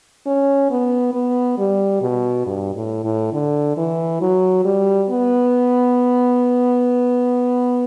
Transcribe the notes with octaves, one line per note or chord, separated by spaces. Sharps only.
C#4
B3
B3
G3
B2
G2
A2
A2
D3
E3
F#3
G3
B3